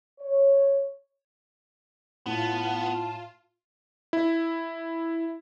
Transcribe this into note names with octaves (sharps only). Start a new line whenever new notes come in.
C#5
A2 B3 F4 A5
E4